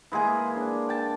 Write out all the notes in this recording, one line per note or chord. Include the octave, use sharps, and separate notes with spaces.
E3 G#3 A#3 G#4
D4
G5 A5